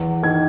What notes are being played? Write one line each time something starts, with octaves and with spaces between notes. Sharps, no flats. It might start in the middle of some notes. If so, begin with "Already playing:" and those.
Already playing: E2
D#3 G#6